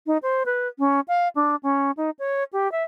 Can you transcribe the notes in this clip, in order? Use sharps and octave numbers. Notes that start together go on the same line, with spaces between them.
D#4
C5
B4
C#4
F5
D4
C#4
D#4
C#5
G4
E5